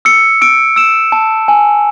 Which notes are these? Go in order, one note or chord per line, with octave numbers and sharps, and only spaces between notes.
E6 C#7
E6 D7
E6 E7
A5
G#5